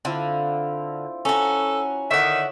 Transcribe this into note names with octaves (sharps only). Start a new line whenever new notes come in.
D3 C4 E4 F4
C#4 F#4 A4 C#5 A5 A#5
D3 D#3 C#5 D#5 E5 F#5